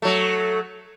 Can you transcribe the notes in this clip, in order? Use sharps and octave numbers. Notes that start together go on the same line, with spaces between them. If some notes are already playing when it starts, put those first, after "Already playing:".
F#3 A3